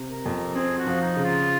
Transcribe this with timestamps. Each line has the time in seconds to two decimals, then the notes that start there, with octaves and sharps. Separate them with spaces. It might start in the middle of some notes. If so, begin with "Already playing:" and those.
Already playing: C3
0.10 A#4
0.26 F2
0.55 C4 G#4
0.78 F#4
0.87 F3
1.01 D#4
1.17 C#3
1.24 F4